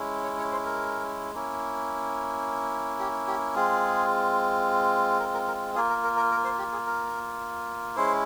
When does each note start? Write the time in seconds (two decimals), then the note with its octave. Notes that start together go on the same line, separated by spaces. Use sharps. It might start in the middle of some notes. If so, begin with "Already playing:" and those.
Already playing: G#3 C#4 E4
0.24 C#5
0.38 C#5
0.52 C5
0.66 A#4
1.34 A#3 C#4 E4
3.00 G4
3.28 G4
3.55 G#3 C4 F4 G#4
5.20 A#4
5.34 A#4
5.48 A#4
5.75 A#3 F4 G#4
5.90 A#4
6.04 A#4
6.17 A#4
6.31 A#4
6.44 C5
6.59 G4
6.73 G#4
6.86 A#4
7.96 G#3 C#4 E4 C5